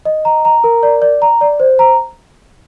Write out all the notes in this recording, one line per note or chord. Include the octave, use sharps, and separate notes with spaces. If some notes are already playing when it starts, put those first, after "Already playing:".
D#5
A#5
A#5
A#4
D5
D5
A#5
D5
C5
A#5